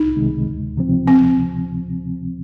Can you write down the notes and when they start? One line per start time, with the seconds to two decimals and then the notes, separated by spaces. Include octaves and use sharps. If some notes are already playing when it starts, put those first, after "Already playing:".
Already playing: C2 D#4
0.16 C3 D#3 G#3
0.47 D2
0.77 C3 F3 C4
1.07 C4